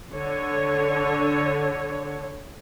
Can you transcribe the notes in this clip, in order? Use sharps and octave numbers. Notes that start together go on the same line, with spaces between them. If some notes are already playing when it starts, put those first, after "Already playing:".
D3 C#5